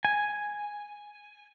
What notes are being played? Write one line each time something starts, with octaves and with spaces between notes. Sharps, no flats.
G#5